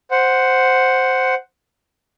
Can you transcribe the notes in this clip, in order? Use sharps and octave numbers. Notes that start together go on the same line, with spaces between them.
C5 F#5